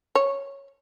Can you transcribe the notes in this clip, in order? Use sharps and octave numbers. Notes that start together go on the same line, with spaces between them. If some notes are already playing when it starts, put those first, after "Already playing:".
C#5